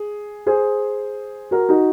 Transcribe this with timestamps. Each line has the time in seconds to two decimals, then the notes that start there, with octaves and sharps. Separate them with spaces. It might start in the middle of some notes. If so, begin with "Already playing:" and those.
Already playing: G#4
0.46 G#4 C5
1.51 F#4 A#4
1.69 D#4 F#4